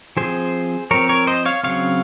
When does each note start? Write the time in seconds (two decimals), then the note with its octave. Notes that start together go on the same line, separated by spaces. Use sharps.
0.17 F3 C4 G#4 C5
0.91 F3 C4 A#4 C#5
1.09 A#4 C#5
1.27 C5 D#5
1.46 C#5 F5
1.63 C#3 F#3 C4 C#5 F5